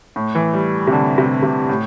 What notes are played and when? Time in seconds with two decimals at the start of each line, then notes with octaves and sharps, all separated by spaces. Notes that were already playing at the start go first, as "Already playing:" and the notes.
0.16 A2
0.35 E3
0.53 G3
0.87 C3
0.92 D3
1.18 C3
1.43 C3
1.69 A2